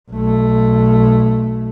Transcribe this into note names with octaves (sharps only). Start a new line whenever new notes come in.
B1 A3